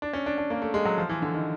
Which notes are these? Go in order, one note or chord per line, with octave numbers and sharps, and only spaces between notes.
D4
C#4
D4
D4
A#3
A3
G#3
F#3
F3
E3
D3
D#3